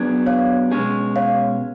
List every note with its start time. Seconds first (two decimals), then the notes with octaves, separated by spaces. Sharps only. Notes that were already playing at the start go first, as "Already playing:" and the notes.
Already playing: F#3 B3 D4 G#4
0.26 C#5 F5
0.71 B2 G#3 C#4 G#4
1.16 C#5 F5